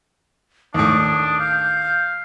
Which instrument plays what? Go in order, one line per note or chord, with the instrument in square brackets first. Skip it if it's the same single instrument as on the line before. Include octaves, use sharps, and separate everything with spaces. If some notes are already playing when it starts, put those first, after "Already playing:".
[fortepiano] D#2 A2 [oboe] D4 [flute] D#6
[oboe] F5 [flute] G6